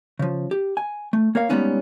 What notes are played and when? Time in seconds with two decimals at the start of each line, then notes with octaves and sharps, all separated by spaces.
0.19 C#3 F3
0.51 G4
0.77 G#5
1.13 A3
1.35 A#3 A#4 C#5 F5
1.49 G3 G#3 A#3 B3 C#4 D#4